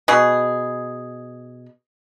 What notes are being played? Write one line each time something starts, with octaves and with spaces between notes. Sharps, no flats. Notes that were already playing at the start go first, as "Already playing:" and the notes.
B2 G#4